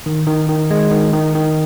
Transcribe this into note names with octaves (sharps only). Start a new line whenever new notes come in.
D#3
D#3
D#3
G#3
D#3
D#3
D#3